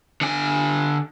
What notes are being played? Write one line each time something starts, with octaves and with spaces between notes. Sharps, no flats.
D3 G#5